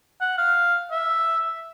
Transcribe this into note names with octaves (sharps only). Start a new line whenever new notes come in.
F#5
F5
E5